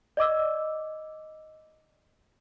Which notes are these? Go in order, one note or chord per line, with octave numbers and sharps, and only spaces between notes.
D5 D#5 D6 E6